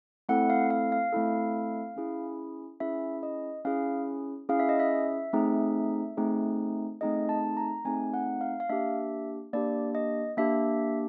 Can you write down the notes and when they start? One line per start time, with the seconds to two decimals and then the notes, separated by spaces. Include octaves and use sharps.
0.29 A3 C4 E4 A4 F#5
0.50 F5
0.70 F5
0.92 F5
1.13 A3 C4 E4 A4
1.96 C#4 E4 G#4
2.80 C#4 E4 G#4 E5
3.23 D#5
3.65 C#4 E4 G#4 F5
4.49 C#4 E4 G#4 F5
4.59 E5
4.69 D#5
4.79 E5
5.33 A3 C4 D#4 G#4
6.17 A3 C4 D#4 G#4
7.01 A3 C4 D#4 G#4 D#5
7.29 A5
7.57 A#5
7.85 A3 C4 D#4 G#4 G#5
8.14 F#5
8.41 F5
8.60 F5
8.69 A#3 D4 G4 E5
9.53 A#3 D4 G4 D5
9.95 D#5
10.37 A#3 D4 G4 E5